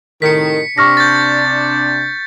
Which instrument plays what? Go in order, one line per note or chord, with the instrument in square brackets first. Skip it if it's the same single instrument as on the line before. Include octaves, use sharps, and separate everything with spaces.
[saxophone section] A2 C3 D#3 [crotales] B6 C#7
[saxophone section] C3 D4 [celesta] C#6 F6 A#6
[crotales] G6 A6